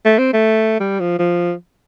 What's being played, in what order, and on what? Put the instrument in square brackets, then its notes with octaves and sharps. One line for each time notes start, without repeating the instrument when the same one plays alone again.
[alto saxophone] A3
C4
A3
G3
F3
F3